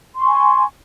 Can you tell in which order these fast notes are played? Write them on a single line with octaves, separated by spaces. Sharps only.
C6 C#6 G#5